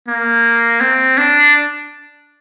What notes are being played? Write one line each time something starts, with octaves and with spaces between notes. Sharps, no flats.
A#3
C4
D4